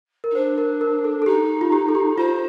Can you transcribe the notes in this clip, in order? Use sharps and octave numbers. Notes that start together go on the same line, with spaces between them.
A#4
D#4
D4 C5
A#4
A#4
A4
A4
D#4 G4
F4
G4
A4
G4
F4 C5